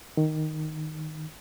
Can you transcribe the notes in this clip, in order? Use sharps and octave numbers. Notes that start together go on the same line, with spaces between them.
D#3